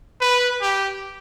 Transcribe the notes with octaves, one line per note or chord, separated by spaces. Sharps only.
B4
G4